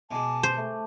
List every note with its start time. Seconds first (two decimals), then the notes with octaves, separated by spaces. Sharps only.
0.11 B2 G#3 G#5 A5 D6
0.43 C5
0.57 A3